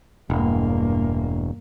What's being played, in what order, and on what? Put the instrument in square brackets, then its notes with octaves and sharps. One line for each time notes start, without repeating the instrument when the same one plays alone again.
[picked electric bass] E1 [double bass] G2 A#3